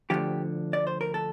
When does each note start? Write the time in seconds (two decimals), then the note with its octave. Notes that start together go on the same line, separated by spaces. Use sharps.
0.10 D2 D3 F3 G4
0.73 D5
0.87 C5
1.01 A#4
1.14 A4